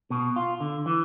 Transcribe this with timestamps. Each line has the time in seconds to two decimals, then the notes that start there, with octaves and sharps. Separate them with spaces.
0.10 B2
0.36 F4
0.60 D3
0.86 E3